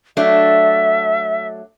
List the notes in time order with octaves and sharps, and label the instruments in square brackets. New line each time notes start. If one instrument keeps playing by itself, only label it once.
[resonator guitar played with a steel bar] F#3 A3 D4 [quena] E5